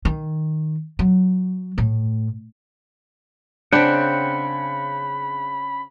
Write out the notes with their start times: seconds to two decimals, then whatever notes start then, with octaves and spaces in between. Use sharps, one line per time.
0.05 D#3
0.99 F#3
1.78 A2
3.73 C#3 C4 D4 F#5 G5 B5